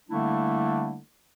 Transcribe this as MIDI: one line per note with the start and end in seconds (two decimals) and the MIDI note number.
0.09 0.98 50
0.09 0.98 55
0.09 0.98 57
0.09 0.98 58
0.09 0.98 62
0.09 0.98 64